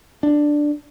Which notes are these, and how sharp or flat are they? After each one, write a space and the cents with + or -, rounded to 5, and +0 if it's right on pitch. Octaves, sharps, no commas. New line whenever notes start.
D4 +5